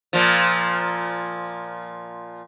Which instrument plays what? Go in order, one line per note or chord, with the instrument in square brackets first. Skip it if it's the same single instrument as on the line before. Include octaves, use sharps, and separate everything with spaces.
[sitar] A#2 F3